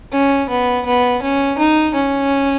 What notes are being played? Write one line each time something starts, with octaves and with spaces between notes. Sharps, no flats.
C#4
B3
B3
C#4
D#4
C#4